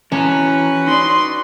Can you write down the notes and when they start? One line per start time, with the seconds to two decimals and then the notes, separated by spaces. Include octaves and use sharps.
0.12 E3 C#4 F#4 B4 A5 A#5
0.88 D#4 D5 C6